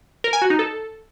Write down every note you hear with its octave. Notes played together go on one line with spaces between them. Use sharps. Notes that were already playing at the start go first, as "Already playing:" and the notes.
A#4
G#5
F#4
D#4
A4